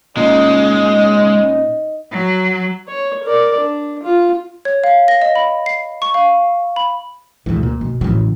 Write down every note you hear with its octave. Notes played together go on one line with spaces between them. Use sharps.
A#2 G#3 C#4 D#4
F#3
C#5
A#4 D5
D4
F4
C#5
F5
A#6
D#5
B5
C7
C#6
F5
B5
D2 G#2 B2 E3
A#2
B2
A1 A2 C#3 E3 F#3